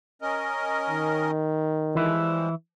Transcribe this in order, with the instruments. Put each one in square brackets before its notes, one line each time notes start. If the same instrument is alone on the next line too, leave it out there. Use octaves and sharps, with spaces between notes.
[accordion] C#4 A#4 D#5
[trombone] D#3
[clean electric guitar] E3 E4 [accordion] F3 G3 G#3